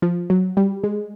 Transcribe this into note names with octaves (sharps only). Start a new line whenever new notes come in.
F3
F#3
G3
G#3